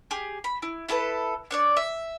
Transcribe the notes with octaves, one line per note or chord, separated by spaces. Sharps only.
G4 G#4
B5
E4
E4 F#4 A4 B4
D4 C#5 D5
E5